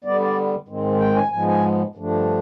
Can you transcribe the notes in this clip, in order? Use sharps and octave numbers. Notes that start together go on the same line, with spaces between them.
D3 G3 B3 D5
D5
G#2 D#3 G#3 C4
G5
G#5
G#2 F3 G#3 B3 G#5
G#5
G2 D3 F3 A3 D4